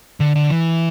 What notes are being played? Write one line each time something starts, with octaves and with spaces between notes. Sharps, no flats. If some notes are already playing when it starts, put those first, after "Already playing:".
D3
D3
E3